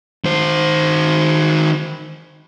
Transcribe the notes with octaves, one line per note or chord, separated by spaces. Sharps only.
D#3 C5